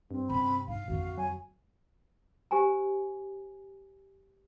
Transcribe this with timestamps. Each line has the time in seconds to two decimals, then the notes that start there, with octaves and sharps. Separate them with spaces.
0.11 G2 C4
0.30 C3 C#4 B5
0.68 G#2 F5
0.88 G#1 F2 D3 F#4
1.18 F#3 G#5
2.51 G4 C5 G#5 A#5